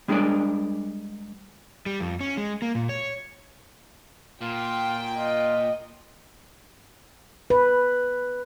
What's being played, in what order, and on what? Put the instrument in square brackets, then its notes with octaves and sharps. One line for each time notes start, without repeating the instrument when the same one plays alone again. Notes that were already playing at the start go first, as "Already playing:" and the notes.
[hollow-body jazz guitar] G3 G#3 D4 G#4 A#4 D5
[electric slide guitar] G3
F2
C#4
G#3
A#3
A#2
C#5
[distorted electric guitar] A#2 [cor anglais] F4 [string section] G5
[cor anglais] F4 [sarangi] D#5
[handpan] B4